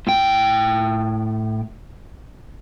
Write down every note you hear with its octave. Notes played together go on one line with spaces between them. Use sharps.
A2 G5